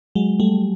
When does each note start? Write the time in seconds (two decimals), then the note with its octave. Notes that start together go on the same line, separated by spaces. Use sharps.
0.15 F#3 G#3
0.40 G3 A3